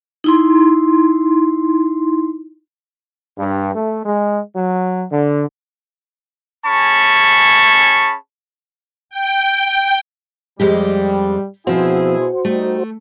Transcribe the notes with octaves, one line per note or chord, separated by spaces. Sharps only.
D#4 E4 C6
G2
A3
G#3
F#3
D3
C#4 G#4 A5 B5 C#6
G5
F2 G3 G#3 G4
B2 F3 C4 E4 F#4 G#4 C5
G3 A3 D#4